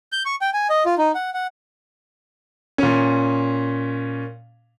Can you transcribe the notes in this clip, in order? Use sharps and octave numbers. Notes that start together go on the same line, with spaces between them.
G6
C#6
G5
G#5
D#5
F4
D#4
F#5
F#5
A#2 C#4